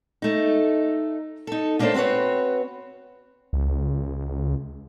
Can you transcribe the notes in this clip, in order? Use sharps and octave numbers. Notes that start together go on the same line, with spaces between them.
A3 D#4
D#4 A4
A3 A#3 C#4 D4 A4 C5
C4 F#4 A#4 B4 C#5
C#2